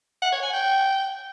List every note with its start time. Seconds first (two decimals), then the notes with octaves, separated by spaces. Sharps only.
0.22 F#5
0.33 C#5
0.43 G#5
0.54 G5